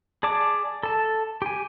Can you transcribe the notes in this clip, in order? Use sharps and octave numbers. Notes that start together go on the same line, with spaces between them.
G#4 D5 A5 D6
A4 A5
G4 G#5